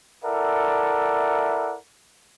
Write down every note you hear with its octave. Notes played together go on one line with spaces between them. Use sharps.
E4 A4 A#4 D5 E5 F#5